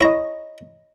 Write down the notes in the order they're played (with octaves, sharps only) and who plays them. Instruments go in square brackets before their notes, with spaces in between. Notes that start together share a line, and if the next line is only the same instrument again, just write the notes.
[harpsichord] E4 A#5 [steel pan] C#5 D#5